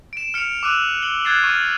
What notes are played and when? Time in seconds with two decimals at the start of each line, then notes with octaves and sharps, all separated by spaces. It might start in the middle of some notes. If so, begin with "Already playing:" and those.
0.13 D7 E7
0.34 F6 C#7 D7 F7
0.63 D6 E6 F#6 D#7 F7
1.02 C#7 F#7 G7
1.25 F6 F#6 G#6 A6 C7 E7
1.44 C#6 F6